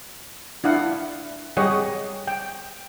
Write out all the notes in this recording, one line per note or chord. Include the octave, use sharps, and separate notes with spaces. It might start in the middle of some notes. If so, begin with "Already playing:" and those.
D4 E4 F5 F#5
G3 G4 G#4 C#5 D#5 F#5
G5